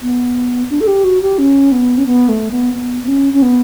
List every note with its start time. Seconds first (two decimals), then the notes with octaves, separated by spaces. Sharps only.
0.02 B3
0.70 D4
0.81 A4
0.87 G4
1.04 F#4
1.22 G4
1.38 C#4
1.72 B3
1.98 C#4
2.06 B3
2.29 A3
2.51 B3
2.74 B3
3.03 B3
3.08 C#4
3.33 C#4
3.42 B3